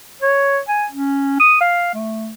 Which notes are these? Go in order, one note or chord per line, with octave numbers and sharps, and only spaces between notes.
C#5
G#5
C#4
D#6
F5
A3